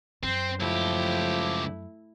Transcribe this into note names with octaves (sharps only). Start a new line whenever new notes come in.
F#2 C4 C5
C#2 F3 A3 E4 G4